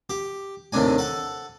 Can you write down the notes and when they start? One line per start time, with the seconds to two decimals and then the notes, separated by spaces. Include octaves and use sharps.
0.10 G4
0.72 D#2 A2 C3 D4 G#5
0.98 A4 F#5